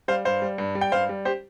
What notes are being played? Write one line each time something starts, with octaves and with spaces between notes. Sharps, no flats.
G3 C5 F5
G2 C5 F5
G3
G2
G3
G5
G2 C5 F5
G3
G4 C5